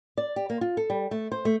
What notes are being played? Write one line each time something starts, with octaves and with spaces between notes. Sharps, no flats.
D5
G4
A#3
F4
A4
G3
A3
C5
A3